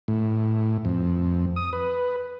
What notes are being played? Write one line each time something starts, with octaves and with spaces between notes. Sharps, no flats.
A2
F2
D#6
B4